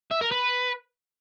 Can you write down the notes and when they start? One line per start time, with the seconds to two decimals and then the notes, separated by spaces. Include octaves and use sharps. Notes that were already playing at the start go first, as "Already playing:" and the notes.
0.11 E5
0.21 A#4
0.31 B4